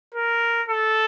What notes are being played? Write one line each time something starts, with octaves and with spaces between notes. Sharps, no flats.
A#4
A4